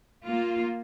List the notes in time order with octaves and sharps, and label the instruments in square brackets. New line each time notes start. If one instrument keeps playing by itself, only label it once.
[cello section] A#3 F4